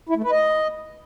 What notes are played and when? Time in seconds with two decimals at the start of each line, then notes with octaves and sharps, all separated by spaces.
0.09 E4
0.17 A3
0.24 B4
0.31 D#5